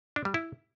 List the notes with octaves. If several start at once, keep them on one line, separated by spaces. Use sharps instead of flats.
D4
G3
E4